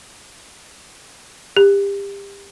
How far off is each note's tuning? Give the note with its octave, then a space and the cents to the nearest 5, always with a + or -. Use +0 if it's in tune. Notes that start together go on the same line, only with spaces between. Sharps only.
G4 +30